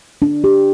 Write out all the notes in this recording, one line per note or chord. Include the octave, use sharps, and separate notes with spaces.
D4
G4